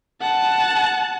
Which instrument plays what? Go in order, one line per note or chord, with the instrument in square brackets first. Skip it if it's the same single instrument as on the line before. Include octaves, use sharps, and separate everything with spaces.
[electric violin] F#5 A5